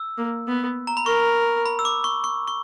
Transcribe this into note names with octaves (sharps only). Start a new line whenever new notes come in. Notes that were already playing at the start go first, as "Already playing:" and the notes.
Already playing: E6
A#3
B3
A#5
B5
A#4 C#6
B5
E6
D6
C#6
C#6
C#6